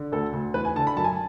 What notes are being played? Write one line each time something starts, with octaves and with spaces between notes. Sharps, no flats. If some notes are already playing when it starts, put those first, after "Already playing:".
Already playing: D3
D2 A4
D2
E2 B4
G#5
D3 A5
B5
F#2 A5
G#5
A5